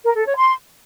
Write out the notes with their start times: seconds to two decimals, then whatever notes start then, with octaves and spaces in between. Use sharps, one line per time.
0.05 A#4
0.15 A4
0.26 C#5
0.37 C6